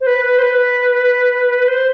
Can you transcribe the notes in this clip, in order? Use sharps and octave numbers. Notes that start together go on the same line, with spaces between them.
C5
B4
B4
C5
B4
C5